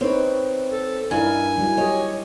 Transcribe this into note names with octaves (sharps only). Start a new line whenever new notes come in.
C4 D#4 B4 C#5
A4
G2 D#4 E4 A#4 G#5
F#3 G3 E4
G4 C#5 D#5